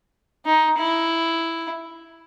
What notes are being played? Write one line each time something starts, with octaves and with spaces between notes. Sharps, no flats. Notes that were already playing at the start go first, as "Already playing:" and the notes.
D#4
E4